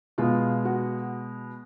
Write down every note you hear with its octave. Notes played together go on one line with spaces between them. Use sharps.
B2 G#3 F4
F#4